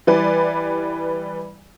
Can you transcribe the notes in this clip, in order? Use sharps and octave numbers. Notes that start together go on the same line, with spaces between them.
E3 G3 B4 D5